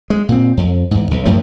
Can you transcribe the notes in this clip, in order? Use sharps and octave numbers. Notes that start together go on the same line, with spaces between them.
G#3
A#2 C4
F2
E2 G#2
B1
F#2 A2 F3 F#3